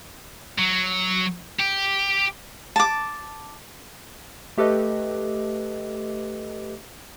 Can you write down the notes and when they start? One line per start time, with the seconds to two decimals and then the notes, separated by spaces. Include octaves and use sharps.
0.59 F#3
1.60 G4
2.76 A5 D6
4.58 A3 G4 A4 B4 D#5